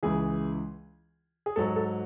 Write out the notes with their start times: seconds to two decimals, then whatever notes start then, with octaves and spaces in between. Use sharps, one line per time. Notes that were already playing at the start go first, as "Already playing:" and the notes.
0.03 C#2 C#3 E3 G#4
1.46 G#4
1.56 G#2 F#3 A4
1.76 A4